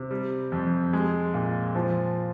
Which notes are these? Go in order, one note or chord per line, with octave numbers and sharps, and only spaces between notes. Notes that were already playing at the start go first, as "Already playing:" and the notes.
Already playing: C3
G3
F2
G#3
A#2
F3